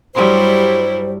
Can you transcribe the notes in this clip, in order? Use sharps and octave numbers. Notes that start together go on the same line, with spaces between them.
G2 F#3 G3 E4 C5 C6